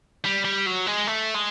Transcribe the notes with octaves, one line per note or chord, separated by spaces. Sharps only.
G3
G3
F#3
G#3
A3
G#3